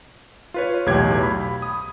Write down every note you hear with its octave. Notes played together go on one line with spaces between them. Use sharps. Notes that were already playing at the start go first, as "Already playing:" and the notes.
F4 B4 C#5
B1 E2 A2 G4 G#6
B5
D#6